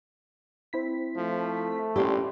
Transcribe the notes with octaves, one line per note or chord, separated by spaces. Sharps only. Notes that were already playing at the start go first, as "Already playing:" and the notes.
C4 E4 B6
F3 A3
A#1 C#4 E4 G4 D5 C6